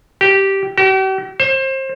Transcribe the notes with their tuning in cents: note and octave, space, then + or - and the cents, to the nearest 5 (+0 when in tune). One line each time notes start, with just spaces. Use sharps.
G4 -10
G4 -45
C5 +30